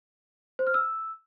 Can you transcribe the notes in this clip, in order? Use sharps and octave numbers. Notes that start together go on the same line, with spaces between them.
C5
F6
E6